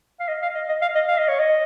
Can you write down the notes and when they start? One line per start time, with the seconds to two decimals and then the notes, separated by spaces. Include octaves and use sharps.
0.20 F5
0.28 D#5
0.42 F5
0.55 D#5
0.69 D#5
0.81 F5
0.95 D#5
1.08 F5
1.18 D#5
1.28 C#5
1.39 D#5